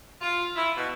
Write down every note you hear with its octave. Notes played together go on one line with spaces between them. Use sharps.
F4
E4
B2